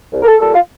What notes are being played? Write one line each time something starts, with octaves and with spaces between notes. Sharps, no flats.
C2
A#4
A4
A#2 G3 A4
F4